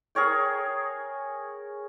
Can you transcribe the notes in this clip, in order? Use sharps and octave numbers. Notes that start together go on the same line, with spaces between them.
G#4 A#4 C#5 G5